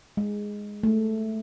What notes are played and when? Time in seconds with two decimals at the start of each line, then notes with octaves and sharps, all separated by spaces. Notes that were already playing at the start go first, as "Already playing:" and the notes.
0.17 G#3
0.83 A3